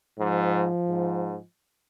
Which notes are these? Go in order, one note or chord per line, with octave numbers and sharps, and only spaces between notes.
G#2 F3
G#2